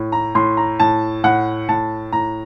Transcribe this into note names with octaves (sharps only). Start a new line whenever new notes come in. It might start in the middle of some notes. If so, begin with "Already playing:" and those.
Already playing: A2
A#5
A2 C6
A#5
A2 A5
A2 F#5
A2 A5
A2 A#5